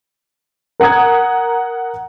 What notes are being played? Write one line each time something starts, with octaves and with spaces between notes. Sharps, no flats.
A#4 F#5 A#5 D#6 G#6